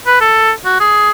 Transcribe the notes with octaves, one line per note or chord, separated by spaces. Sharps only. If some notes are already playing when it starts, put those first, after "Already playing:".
B4
A4
F#4
G#4